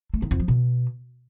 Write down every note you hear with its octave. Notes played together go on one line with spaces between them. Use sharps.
A3
D#3
F2
F3
B2